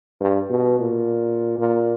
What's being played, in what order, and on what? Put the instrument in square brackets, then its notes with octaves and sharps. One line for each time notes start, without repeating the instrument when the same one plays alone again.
[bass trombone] G2
B2
A#2
A#2